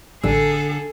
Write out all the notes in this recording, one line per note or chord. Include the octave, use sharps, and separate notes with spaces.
A1 D3 G3 G#4 A4 E6